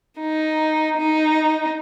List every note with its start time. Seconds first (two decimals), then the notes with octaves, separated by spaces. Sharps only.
0.20 D#4
0.98 D#4